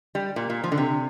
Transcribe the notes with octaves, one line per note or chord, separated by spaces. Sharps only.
G3
A#2
A#2
F3
D3
C3